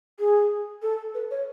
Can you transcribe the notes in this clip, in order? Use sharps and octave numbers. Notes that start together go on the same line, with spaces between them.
G#4
A4
B4
C#5